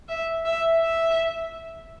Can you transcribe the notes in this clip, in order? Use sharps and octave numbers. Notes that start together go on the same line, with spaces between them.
E5
E5
E5